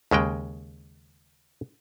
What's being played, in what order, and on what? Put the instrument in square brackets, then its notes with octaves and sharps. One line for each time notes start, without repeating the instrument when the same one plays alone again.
[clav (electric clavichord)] D#2 C#3 G#3 G5